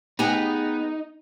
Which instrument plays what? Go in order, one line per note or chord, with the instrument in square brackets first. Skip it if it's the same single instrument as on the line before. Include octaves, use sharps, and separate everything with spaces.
[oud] B3 G4 G#4 [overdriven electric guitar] D#4